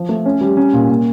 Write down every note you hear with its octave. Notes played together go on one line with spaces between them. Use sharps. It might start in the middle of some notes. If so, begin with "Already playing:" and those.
Already playing: F3
A3
C#4
G3
C#4
A#2
A#2